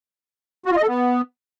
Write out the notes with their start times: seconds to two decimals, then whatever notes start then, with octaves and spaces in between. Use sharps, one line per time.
0.66 F#4
0.71 F4
0.77 D#5
0.82 A4
0.88 B3